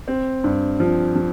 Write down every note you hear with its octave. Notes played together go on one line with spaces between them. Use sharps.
C4
G2
F3
F3